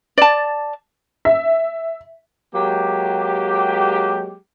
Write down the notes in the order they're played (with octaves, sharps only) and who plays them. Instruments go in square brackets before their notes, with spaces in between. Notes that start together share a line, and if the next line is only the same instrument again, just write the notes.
[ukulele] D5 A5
[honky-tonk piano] E5
[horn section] F#3 G#3 A#3 G4